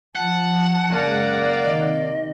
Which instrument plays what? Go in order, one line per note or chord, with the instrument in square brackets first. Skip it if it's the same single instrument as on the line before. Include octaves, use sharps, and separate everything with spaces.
[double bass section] F3 [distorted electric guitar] F#5 [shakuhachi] A5
[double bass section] F#2 C#3 G#3 [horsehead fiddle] A#3 D5
[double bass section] C3 D#3 [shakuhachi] D#5